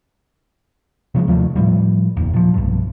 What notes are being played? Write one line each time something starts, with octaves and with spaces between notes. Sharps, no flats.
C3 F3 F#3 G#3
D#2 F3 F#3 A3
A2 F3 G3
F1 D#2
A#2 F3
B1 G2